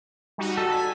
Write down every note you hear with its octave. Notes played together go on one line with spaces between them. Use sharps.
G3 D#4 F#4
A4
G#5 B6